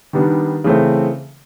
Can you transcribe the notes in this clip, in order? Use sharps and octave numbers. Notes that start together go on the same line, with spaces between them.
D#3 G3 B3 D4
C#3 E3 A3 C4